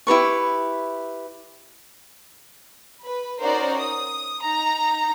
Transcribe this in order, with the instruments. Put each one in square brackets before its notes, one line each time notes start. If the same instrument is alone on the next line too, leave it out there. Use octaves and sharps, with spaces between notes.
[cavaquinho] E4 G4 B4 C#6
[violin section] B4
C#4 D#4 F#4 A#4 C5 D5
D#6
D#4 A#5